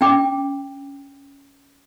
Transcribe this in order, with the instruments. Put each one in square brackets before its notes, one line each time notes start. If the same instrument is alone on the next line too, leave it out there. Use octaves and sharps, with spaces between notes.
[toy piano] C#4 D4 G5 D6